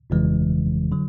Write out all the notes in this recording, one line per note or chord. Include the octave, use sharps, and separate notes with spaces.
G1 F2 C#3 E3 G#3
D3 F#3